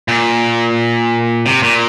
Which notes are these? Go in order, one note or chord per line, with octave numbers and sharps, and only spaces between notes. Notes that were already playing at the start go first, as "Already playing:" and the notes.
A#2
C3
A#2